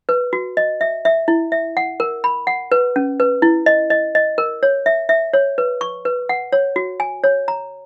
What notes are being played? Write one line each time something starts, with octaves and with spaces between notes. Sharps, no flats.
B4
F#4
D#5
E5
E5
E4
E5
F#5
A#4
B5
F#5
B4
C#4
B4
E4
D#5
D#5
D#5
A#4
C#5
E5
E5
C#5
B4
C#6
B4
F#5
C#5
F#4
G#5
C#5
A#5